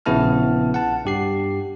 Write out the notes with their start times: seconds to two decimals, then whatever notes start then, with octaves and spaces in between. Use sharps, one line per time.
0.06 A#1 C#3 B3 E4 A5 F6
0.74 F#5 A5
1.05 G2 G4 C7